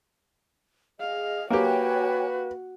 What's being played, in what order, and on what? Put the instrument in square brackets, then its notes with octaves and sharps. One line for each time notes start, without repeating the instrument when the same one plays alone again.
[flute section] G#4 D#5 [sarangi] F5
[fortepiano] A#3 G4 [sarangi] F#4 [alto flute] B4 [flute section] C#5 G5 G#5